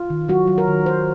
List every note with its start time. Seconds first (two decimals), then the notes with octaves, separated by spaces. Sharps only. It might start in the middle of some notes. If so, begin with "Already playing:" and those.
Already playing: F4
0.10 D#3
0.28 F#3 F#4
0.47 F#3
0.58 A#4
0.68 D#3
0.86 F#3 C5